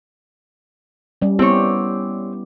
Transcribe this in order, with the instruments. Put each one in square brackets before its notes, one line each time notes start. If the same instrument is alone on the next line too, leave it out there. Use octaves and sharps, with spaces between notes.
[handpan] G3 C#4
[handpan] B3 E4 G4 [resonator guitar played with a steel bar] C4 C#5